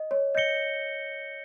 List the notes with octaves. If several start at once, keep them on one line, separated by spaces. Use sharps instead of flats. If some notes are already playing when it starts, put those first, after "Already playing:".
Already playing: D#5
C#5
D#5 G6 A#6 C#7 G7